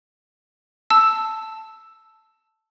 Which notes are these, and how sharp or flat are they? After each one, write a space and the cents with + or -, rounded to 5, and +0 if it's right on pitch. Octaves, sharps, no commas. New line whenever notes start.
A5 +0 E6 +0